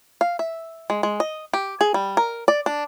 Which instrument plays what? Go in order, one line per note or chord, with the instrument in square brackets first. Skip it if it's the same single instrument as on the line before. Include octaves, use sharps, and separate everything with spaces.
[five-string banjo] F5
E5
G#3
G#3
D#5
G4
G#4
G3
A#4
D5
D4